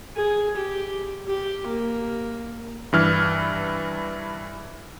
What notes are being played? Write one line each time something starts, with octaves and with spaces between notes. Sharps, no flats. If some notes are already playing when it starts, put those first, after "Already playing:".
G#4
G4
G4
A#3
G2 E3 F6